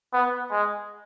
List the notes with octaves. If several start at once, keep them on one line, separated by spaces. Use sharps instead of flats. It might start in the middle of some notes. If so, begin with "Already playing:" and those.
B3
G#3